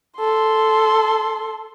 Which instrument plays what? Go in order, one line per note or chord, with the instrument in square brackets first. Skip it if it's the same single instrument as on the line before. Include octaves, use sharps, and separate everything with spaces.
[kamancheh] A4 C6